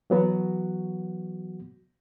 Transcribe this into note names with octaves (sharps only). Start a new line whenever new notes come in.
E3 F#3 B3 F#4